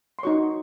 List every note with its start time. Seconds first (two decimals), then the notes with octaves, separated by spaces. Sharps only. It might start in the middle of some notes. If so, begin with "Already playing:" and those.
0.19 C6
0.23 D#4 F#4 C#5 C#6